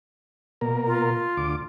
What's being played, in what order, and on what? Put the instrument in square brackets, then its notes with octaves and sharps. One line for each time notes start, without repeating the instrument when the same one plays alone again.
[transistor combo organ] B2 A#3 A#4
[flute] F4
[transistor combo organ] D2 D6